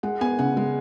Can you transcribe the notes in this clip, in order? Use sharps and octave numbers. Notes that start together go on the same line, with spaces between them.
G#3 F#5
B3 G#5
C#3 F#5
G#3